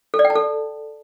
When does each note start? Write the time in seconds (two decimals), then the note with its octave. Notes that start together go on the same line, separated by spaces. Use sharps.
0.14 A4
0.19 D5
0.25 G5
0.30 A5
0.36 A4